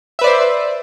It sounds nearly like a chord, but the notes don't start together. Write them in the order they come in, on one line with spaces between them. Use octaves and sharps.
E5 B4 D5 C5